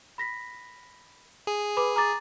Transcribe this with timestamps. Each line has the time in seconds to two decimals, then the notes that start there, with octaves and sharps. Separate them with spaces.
0.18 B5 A#6 B6
1.47 G#4
1.77 B4 B5 D6
1.96 A#5 D6 A6